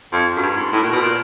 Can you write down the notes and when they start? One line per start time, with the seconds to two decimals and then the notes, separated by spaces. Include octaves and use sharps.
0.13 F2
0.37 F#2
0.42 G2
0.57 G#2
0.72 A2
0.82 A#2
0.92 B2
1.02 A#2